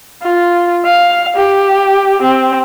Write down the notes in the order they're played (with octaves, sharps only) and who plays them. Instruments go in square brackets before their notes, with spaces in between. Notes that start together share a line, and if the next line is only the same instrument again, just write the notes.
[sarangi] F4
F5
G4
C4